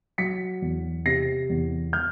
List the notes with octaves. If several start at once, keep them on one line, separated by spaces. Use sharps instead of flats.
F#3 B6 C#7
E2
C3 A#6 C7
E2
F6 G6